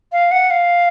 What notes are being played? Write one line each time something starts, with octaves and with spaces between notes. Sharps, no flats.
F5
F#5
F5